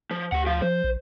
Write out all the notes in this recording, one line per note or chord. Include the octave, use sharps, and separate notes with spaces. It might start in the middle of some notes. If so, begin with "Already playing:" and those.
F3
D2 G4 F#5
F3 F5
F3 C5
A#1